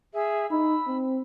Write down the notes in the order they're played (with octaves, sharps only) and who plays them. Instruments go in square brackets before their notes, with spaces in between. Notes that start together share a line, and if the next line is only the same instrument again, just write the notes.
[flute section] G#4 E5 E6
[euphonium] D#4 [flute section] B5 E6
[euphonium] C4